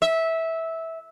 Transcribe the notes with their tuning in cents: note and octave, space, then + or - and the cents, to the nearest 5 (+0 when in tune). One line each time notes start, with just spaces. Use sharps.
E5 -15